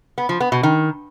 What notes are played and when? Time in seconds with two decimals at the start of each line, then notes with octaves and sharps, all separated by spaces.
0.18 B3
0.29 F3
0.40 B3
0.52 B2
0.63 D#3